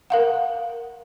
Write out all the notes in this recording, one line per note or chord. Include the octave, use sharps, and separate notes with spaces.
A#4 F5 F#5